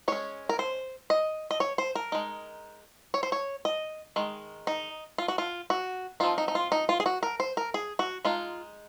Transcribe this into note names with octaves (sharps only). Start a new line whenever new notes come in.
G#3 C#4 C#5
A#4
C5
D#5
D#5
C#5
C5
A#4
G#3 D#4
C#5
C5
C#5
D#5
D#3 G#3
D#4
F4
F#4
F4
F#4
F3 C4 D#4 F4
D#4
D#4
F4
D#4
F4
G#4
F#4
A#4
C5
A#4
G#4
F#4
G#3 D#4 F4